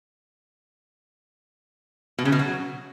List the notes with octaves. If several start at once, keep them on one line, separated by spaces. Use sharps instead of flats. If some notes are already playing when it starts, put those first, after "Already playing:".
B2
C#3
B2
F#3